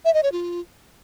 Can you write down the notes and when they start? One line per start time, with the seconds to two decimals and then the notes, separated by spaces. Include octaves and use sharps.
0.05 E5
0.14 D#5
0.23 C#5
0.32 F4